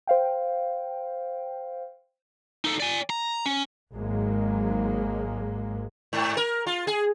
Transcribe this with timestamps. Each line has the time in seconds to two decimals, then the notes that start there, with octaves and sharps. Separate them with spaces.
0.07 C5 F5 G5
2.65 D#4 A4
2.80 D5 G#5
3.10 A#5
3.46 C#4
3.94 G#1 G#2 F#3 G#3 A#3
6.13 G#2
6.37 A#4
6.67 F4
6.87 G#4